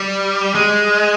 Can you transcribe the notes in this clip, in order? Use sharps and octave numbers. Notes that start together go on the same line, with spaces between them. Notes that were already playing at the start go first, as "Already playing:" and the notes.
Already playing: G3
G#3